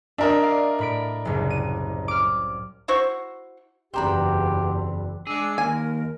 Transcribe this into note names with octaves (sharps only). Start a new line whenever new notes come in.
D4 A#4 D#5 E5 E6
D5 F5
A2 B5 D7
F#1 C2 C3
D#7
D6 F6
E4 F#4 C5 C#6
F#1 E2 C4 D4 G4 C5 A#5 B5
G#3 D4 G#4 D6 E6
D#2 A#4 G#5